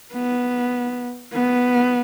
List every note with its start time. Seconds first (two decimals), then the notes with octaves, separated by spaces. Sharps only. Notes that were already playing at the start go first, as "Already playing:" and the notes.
0.13 B3
1.33 B3